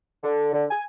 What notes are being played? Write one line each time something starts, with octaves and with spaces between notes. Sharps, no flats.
D3
D3
G#5